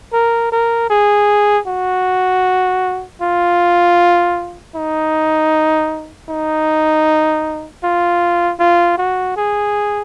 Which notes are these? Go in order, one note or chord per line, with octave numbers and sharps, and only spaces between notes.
A#4
A#4
G#4
F#4
F4
D#4
D#4
F4
F4
F#4
G#4